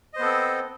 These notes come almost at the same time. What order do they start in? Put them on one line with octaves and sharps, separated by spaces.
D#5 C5 B3 A4 C4